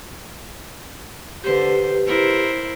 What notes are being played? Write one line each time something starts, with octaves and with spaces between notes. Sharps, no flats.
D3 G4 B4 C5
E4 A#4 C5